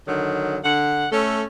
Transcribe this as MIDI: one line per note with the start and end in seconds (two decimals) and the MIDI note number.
0.07 0.58 50
0.07 0.58 51
0.07 0.58 54
0.64 1.07 50
0.64 1.07 78
1.12 1.44 57
1.12 1.44 61
1.12 1.44 69